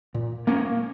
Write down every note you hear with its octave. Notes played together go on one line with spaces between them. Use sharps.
A#2
A#3 C#4